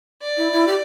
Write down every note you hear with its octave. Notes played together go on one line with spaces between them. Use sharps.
D5
E4
E4
G4